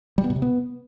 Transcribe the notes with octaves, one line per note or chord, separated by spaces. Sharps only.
G3
B3
B2
C3
B3